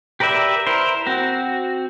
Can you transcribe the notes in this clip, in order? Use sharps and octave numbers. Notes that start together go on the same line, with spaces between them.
G4 A#4 B4 D5 E5
E4 A#4 C5
C4 F#4